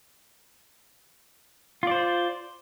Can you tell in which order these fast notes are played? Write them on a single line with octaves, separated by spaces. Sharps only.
F4 D5 C5